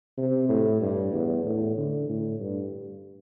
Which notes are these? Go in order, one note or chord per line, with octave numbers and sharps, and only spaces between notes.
C3
A2
G2
E2
A2
D3
A2
G2